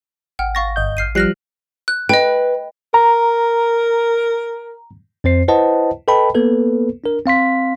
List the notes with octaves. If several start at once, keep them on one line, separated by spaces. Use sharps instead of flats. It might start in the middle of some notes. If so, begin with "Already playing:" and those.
G#1 F#5 G5 F6
F5 C#6 A6 A#6
G1 D#5 G6
A1 F6 C7 D#7
F3 G3 F6 F#6 A#6 C7
F#6
B4 D#5 G5
A#4 A#5
F2 C4 C5 C7
E4 B4 C5 D#5 F#5 A5
A4 B4 D#5 G5 A5 B5
A#3 B3 A4 B4
D4 A#4
C4 F5 C6 B6